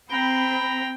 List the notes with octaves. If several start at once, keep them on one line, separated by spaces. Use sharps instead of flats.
C4 G5 A#5 B5